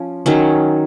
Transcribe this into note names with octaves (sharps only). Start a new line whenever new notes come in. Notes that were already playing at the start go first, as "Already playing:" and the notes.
Already playing: F3 C#4
D#3 F#3 C#4